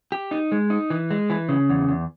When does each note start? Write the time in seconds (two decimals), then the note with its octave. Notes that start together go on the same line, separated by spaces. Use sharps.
0.12 G4
0.31 D#4
0.52 G#3
0.70 D#4
0.90 E3
1.11 G#3
1.30 E3
1.49 C#3
1.69 E2
1.89 E2